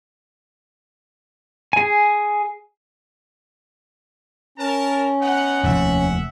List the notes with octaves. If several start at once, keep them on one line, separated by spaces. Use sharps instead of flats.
G#4 G#5
C#4 A#4 A5
B3 D#4 F#5
F1 D#2 E5 F#5